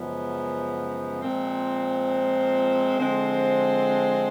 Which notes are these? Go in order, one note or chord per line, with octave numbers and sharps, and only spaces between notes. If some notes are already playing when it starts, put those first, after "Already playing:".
Already playing: F#2 C#3 F3 G#3 B3
A#2 F3 G#3 C4
D3 F3 G#3 C4